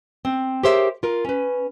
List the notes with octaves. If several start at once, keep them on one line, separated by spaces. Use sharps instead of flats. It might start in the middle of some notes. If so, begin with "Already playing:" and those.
C4
G4 G#4 A#4 C5 C#5 E5
F4 A#4
C#4 B4